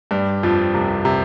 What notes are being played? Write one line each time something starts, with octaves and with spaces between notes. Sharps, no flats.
G2 G3
F2 F3
C2 C3
C3